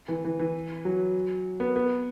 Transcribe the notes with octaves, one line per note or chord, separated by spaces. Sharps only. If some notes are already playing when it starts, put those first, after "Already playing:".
E3
E3
E3
F#3
B3
B3